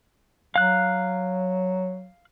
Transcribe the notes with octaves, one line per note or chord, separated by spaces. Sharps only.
F#3 F5 F#6